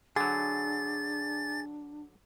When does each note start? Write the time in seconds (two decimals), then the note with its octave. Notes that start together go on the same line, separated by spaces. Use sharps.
0.16 D3 F#3 D4 G#4 A6